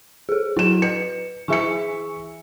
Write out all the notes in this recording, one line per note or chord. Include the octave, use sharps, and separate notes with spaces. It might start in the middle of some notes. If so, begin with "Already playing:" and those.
G#4 A4
F#3 E4 E7
B4 C#7
E3 G#4 E5 G#5 C#6 C#7